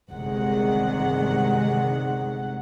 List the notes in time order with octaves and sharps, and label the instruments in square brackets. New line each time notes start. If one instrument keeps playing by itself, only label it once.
[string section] G1 C2 D#3 G#3 F#5